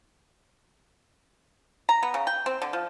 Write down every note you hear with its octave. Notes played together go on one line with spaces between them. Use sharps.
A#5
B3
C#3
G5
C4
D3
F3